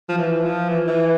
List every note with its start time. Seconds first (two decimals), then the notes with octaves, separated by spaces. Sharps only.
0.09 F3
0.18 E3
0.43 F3
0.69 E3
0.87 E3